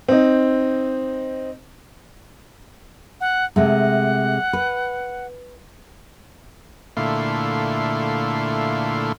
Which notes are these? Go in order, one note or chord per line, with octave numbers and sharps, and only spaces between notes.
C4 D#4
F#5
C3 G#3 A3 F#5
B4
A#2 D3 A3 E4 F5 C6